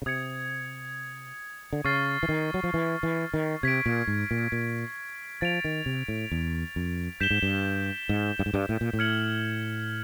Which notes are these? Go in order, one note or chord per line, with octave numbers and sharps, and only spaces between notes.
C#3
C3 D#6 G#6 C#7
D3
C#3 C#6 F6 A6 C7
E3
D#3
F#3
F3
E3
E3
D#3
C3 G#6 B6 D7
A#2
G#2
A#2
A#2
F3 A6 D7 F7
D#3
C3
A2
E2
F2
G2 G6 B6 E7 G7
G#2
G2
G#2
G2
G#2
G2
A2
A#2
A2
F6 G#6 C#7 F#7